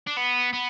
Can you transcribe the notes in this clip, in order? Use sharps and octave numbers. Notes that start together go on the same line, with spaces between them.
D4
B3
B3